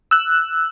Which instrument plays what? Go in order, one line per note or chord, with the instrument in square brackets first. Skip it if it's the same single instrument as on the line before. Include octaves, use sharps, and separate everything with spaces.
[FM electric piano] E6 F#6